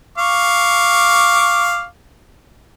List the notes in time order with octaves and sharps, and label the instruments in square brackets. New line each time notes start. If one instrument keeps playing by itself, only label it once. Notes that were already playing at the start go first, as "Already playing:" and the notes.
[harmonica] F5 C#6 D6